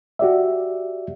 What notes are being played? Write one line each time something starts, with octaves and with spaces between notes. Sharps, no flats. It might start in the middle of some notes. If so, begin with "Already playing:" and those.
F#4 G4 D5 E5